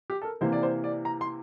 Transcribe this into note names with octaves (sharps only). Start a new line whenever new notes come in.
G4
A4
A#4
C3 E3 A#3 C5
D5
C5
D5
A#5
C6